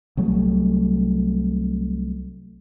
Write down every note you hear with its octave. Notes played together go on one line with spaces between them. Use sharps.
C2 F#3 A3